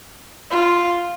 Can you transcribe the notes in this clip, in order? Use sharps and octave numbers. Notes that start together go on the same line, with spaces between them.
F4